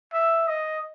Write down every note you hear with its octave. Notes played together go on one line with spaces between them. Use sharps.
E5
D#5